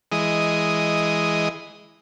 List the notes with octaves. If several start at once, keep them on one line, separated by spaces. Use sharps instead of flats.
E3 G#3 D#5